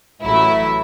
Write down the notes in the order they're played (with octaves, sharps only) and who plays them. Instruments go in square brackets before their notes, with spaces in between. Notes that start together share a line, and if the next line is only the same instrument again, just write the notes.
[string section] A1 A2 F#3 A3 E4 E5